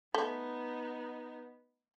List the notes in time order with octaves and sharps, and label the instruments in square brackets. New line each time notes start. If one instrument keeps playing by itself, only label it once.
[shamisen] A3 [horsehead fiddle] B3 D#4